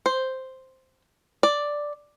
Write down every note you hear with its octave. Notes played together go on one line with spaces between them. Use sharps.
C5
D5